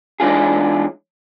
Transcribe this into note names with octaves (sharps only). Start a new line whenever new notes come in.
E3 G#3 D4 D#4 F4 G#4